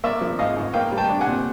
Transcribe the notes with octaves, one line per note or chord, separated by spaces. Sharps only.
A#3 D5 E5
F3
G#2 D#5 F5
G#2
A#3 F5 G5
G3
G5 A5
D4
F#5 G#5
A#2